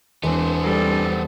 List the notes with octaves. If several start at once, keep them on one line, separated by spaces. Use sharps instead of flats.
E1 B3 C4 D4 G#5 C6
G3 A4